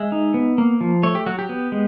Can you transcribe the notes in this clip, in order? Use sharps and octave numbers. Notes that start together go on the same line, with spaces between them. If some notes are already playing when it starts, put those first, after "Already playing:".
Already playing: G#3 E5
D#4
B3
A#3
F3
A3 C#5
G4
F#3 F#4
G4
B3
G#3